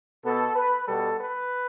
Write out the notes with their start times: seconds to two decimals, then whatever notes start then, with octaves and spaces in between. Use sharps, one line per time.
0.23 B2 B3 A4
0.55 B4
0.87 B2 G3 B3 A4
1.20 B4